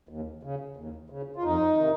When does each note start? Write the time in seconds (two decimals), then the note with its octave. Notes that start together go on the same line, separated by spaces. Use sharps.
0.09 D#2
0.43 C#3
0.77 D#2
1.10 C#3
1.36 F4
1.44 F2 D#4
1.77 C3 D#3